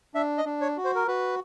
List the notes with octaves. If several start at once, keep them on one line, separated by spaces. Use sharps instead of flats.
D4 E5
D#5
D4
C#5
F#4
C5
A#4
F#4 B4